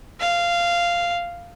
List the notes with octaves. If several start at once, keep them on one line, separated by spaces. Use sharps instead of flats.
F5